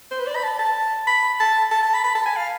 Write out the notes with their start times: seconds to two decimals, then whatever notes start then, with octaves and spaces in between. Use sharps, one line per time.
0.11 C5
0.19 B4
0.27 D5
0.36 B5
0.44 A5
0.59 A5
1.07 B5
1.40 A5
1.71 A5
1.83 A5
1.94 B5
2.04 B5
2.15 A5
2.26 G#5
2.36 F5